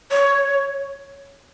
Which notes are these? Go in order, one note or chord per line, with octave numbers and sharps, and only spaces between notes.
C#5